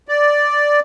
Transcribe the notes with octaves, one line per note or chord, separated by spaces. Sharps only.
D5